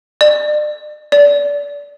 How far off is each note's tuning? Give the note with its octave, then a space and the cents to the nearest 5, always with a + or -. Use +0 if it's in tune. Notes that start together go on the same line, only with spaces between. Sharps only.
D5 +40
D5 -25